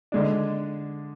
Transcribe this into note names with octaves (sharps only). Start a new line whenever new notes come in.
D3 G#3 D4